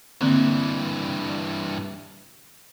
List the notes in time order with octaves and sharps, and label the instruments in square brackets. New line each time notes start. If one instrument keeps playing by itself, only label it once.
[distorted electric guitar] G2 E3 [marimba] D3 A#3 C4